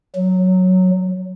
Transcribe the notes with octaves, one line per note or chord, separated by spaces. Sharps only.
F#3